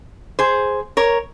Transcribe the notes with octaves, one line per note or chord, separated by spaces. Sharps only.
G#4 C5
A#4 C#5